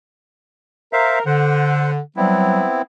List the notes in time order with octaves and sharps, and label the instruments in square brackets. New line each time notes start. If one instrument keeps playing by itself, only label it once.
[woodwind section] A#4 [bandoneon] C5 E5 F5
[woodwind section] D3 [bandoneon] C5 F#5
[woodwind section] F#3 G3 [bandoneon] B3 C4 E4